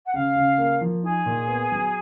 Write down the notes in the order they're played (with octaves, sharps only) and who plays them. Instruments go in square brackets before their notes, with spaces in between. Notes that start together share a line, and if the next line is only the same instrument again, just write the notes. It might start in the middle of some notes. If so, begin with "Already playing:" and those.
[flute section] F#5
[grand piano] C#3 [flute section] F5
[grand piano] C#3
A#3
F3
[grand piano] D#4 [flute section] G#4
[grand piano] A#2
B3
F#3